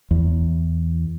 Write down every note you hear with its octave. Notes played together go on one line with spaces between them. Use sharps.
E2